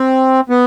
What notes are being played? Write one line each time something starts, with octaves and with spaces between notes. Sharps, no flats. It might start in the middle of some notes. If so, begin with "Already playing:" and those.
Already playing: C4
B3